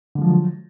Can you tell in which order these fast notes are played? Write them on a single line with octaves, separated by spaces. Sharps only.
D3 G#3 F3 F#3